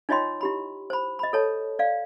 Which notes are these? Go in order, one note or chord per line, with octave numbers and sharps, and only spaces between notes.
D#4 F4 C#5 D#5 G5 C6
E4 G4 B5
C5 B5
D#5 B5
A4 C#5 A5
D5 F5